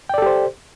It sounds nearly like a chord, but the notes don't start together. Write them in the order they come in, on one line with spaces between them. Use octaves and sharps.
G5 D5 A4 G4 C5